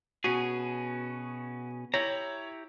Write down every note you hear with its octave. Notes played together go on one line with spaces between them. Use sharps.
B2 C#4 F#4 G#4
E4 G4 C#5 A#5